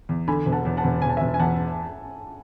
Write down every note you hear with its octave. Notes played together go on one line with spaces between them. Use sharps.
E2
D3 G#5 B5
E1
F#5 A5
E2
F#5 A5
E1
E1 G#5
A5
E5 G#5
E1
G#5
E2 F#5 A5